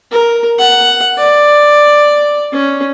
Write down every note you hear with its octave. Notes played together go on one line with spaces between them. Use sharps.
A#4
F#5
D5
C#4